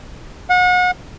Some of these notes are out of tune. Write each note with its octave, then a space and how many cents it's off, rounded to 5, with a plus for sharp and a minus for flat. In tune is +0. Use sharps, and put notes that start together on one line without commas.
F#5 -35